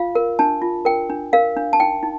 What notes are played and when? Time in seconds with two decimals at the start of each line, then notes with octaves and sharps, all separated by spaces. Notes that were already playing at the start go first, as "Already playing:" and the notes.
Already playing: F4 F5
0.15 A#4
0.39 D4 A5
0.62 F4
0.85 A#4 G5
1.10 D4
1.33 A#4 F5
1.57 D4
1.73 A5
1.80 D#4 G5
2.03 D#4